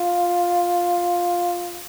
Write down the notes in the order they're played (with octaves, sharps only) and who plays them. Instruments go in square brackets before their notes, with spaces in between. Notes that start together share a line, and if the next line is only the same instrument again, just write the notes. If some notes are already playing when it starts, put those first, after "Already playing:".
Already playing: [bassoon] F4